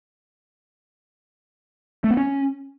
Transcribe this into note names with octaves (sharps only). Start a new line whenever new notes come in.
A3
B3
C#4